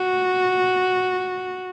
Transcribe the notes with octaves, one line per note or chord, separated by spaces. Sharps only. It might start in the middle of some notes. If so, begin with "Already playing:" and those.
Already playing: F#4